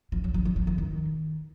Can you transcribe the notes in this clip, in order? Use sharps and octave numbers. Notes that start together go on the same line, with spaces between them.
F3
F#3
F#3
F#3
F3
E3
D#3